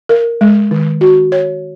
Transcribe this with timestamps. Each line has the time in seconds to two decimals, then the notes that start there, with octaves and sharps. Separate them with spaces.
0.09 A#4
0.41 G#3
0.71 D#3
1.01 F#4
1.32 C#5